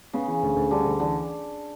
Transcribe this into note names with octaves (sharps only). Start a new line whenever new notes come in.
C#3 B3
E3
D2
D2
D3 G3
D2
D3 E3